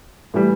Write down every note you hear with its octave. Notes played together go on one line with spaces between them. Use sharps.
A2 E3 G3